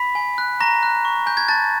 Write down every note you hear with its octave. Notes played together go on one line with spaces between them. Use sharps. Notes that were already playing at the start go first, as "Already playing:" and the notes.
Already playing: B5 B6
G#5
F#6
A#5 C#6 A#6
F#6
C#6
G#5 G6
G#6
A5 F#6 A6